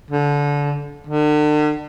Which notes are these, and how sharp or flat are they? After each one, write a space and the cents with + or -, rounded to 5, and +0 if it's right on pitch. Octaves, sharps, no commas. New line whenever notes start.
D3 -25
D3 +40